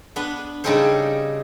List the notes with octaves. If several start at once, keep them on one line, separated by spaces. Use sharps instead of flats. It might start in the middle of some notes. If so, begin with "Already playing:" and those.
B3 D4 B4
C#3 G3 D#4 G4 A4 C5